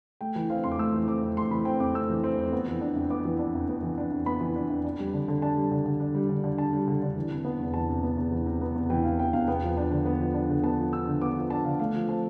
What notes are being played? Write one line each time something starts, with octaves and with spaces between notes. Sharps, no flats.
A3 G5
E3
C4 F5
F2 C6
D6
A3 E6
E3
C4 D6
F2
A3 C6
E3 B5
C4 G5
F2 D6
A3 E6
E3
C4
F2
B3
E3
D4
F2
B3 D6
E3
D4
F2
B3
E3
D4
F2
B3 B5
E3
D4
F2
D4
G3
D3
D3
D4 A5
G3
D3
D3
D4
G3
D3
D3
D4 A5
G3
D3
D3
E3
C3
B3
E2
E3 A5
C3
B3
E2
E3
C3
B3
E2
E3 G5
C3 F5
B3 G5
E2 F5
B3 G5
F3
D4
D3
B3
F3
D4
D3
B3 A5
F3
D4 E6
D3
B3 D6
F3
D4 A5
D3 F5
A3 F5
F3
C4 A5